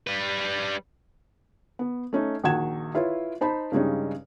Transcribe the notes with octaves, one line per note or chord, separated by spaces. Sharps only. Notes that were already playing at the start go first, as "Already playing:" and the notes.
G3 B4
B3
A3 C#4 D#4
A#1 D#3 F#4 F#5 G#6 E7
E4 F4 B4 C#5
D#4 C5 A5 B5
G2 C#3 G3 G#3 C#4 D#4